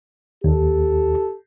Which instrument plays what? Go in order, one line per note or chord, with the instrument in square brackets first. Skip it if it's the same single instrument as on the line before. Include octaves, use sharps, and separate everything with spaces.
[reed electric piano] D#2 [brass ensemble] G4 A4